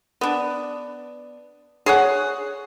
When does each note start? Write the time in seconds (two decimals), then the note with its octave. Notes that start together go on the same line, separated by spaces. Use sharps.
0.21 B3 D4
1.86 G#4 C#5 F#5